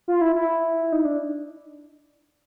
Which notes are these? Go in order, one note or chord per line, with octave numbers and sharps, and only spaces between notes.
F4
E4
E4
D#4
D4